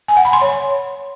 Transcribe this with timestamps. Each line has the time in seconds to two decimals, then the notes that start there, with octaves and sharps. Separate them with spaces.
0.08 G#5
0.17 F#5
0.25 B5
0.33 C6
0.41 C#5